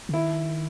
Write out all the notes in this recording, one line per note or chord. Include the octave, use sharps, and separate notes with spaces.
C#3
D#3 E4